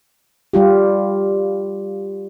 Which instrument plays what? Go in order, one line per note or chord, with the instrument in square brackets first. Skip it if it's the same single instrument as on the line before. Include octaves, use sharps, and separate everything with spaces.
[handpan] G3 F4 G4